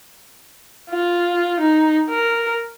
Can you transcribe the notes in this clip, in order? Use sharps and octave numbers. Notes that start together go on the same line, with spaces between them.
F4
D#4
A#4